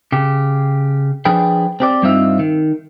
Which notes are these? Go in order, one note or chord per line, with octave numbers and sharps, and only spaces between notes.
C#3 G4
F3 D4 G#4 B4 G5
C4 G4 D5
G2 G3 C4 D#4 F4 E5
D#3